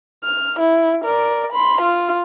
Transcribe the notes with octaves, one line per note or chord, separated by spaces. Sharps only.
F6
E4
A#4 D5
B5 C6
F4